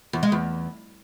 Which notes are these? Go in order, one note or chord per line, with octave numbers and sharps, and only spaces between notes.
E2
G#3
E2